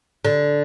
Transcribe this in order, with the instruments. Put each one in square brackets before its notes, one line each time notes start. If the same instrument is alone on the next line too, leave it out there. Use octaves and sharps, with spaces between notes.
[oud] D3